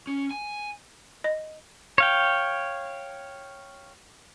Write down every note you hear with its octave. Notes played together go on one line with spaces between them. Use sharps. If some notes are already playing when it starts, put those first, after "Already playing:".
C#4
G#5
D#5
C#5 F5 G5